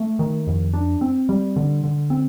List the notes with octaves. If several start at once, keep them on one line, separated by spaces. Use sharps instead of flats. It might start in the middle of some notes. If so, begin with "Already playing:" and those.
Already playing: A3
D#3
F2
D4
C4
G3
D3
D3
C4